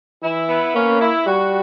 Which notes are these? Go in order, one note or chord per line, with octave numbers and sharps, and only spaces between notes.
E3 E4
B3
A#3 C#4
E4
G3 F#4